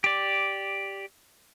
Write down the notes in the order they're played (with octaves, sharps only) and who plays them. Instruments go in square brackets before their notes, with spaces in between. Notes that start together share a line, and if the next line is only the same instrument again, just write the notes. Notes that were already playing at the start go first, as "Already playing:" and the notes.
[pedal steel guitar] G4 D5